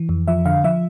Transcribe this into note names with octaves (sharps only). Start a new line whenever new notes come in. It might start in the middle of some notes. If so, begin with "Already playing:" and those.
Already playing: E3
F2
F3 E5
D3 F5
F3 E5